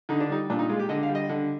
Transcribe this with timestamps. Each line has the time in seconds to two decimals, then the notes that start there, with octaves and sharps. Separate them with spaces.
0.09 D3 D#4
0.20 D4
0.30 G3 D#4
0.50 A#2 D4
0.59 D#4
0.69 G#3 F4
0.79 G4
0.89 D3 D#5
1.03 F5
1.09 G3
1.15 D#5
1.29 D3